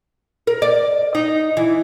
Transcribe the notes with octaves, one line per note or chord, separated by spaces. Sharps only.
A#4
D5
D#4
E3